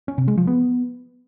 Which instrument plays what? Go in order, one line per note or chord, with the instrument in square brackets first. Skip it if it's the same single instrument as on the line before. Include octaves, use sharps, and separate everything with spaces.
[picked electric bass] C#4
C3
G#3
F3
B3